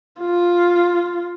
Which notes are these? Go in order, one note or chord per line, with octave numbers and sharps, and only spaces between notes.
F4